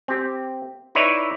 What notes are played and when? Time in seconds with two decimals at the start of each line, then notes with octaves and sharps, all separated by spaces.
0.08 C4 G4
0.95 D#4 E4 B4 C#5 D5 E5